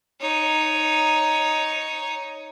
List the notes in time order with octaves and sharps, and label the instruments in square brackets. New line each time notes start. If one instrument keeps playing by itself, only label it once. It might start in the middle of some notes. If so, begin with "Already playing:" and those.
[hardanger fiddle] D#4 C#5